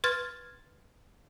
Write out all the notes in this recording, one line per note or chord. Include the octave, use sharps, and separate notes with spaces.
B4 C6 F6 G#6 A6